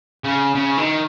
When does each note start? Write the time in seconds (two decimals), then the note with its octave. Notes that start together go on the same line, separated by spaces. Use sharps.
0.24 C#3
0.55 C#3
0.78 D#3